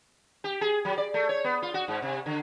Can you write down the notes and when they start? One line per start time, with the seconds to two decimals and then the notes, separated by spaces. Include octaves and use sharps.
0.44 G4
0.61 G#4
0.85 F#3
0.98 D5
1.14 A3
1.29 C#5
1.44 B3
1.62 F4
1.74 F#4
1.88 G#2
2.02 C3
2.26 D3